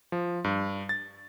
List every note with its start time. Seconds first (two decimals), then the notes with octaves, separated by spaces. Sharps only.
0.12 F3
0.44 G2
0.89 A6